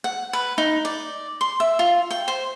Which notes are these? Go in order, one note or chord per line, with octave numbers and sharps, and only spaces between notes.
F#5
B4
D#4
D5
C6
E5
F4
G5
C5